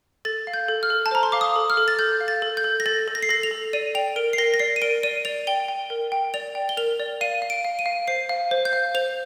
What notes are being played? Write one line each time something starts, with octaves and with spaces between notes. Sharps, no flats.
A4 A6
F5
G6
A4
F6
A4
A5
C5 A#5
C6
F5 D6
D#6
A4
F6
A4
A6
A4 G6
F5
A6
A4
G6
A4
A#6
A4 A6
A4
A#6
C7
A4 A#6
F7
A4
D5 D#7
G5 F7
A#4 D7
C7
A#4 A#6
A#6
D5 C7
D#7
A#4 D7
D5 D#7
D5 F7
G5 G7
G5
A#4
G5
D5 F7
G5
G7
A#4 F7
D5
F5 D#7
F5
D7
F5
D#7
F5
C5 C7
F5
C5
G6
F5
C5 F7